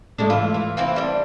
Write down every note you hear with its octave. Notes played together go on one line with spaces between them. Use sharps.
G#3 A3 D4
E3 E4 F4
E3
A#3 C4 E4
G3 D4